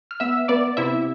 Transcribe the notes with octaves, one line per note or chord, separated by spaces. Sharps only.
F6
B3 E5 E6
B3 D5 D6
C3 E4 E5